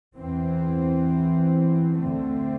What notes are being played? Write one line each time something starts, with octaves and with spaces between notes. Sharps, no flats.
E2 E3 C4
D2 D3 A3 C4